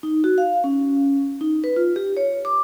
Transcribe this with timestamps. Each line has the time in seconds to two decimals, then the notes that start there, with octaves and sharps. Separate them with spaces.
0.03 D#4
0.24 F#4
0.38 F5
0.64 C#4
1.41 D#4
1.64 B4
1.76 F4
1.96 G4
2.17 C#5
2.45 D6